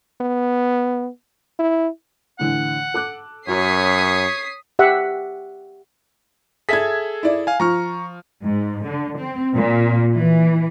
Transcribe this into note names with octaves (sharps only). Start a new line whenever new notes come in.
B3
E4
A2 D3 E3 F#5
A4 D6 F#6
F#2 F#4 A#4 C#5 D#6 B6 C7
G4 E5 F#5
G#4 A4 E5 G#6 B6
E4 D5
F5 G#5
F3 A#5 C#6 F6
G#2
D3
C4
A#2
E3